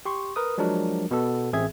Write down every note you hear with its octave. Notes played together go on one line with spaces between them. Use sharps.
G4 C6 C#6
A#4 B4 D#6
F3 F#3 G#3 D4 A#4
B2 B3 A4
A1 C4 G#4 E5 G#6